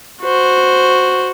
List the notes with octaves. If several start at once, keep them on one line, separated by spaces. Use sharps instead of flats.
F#4 C5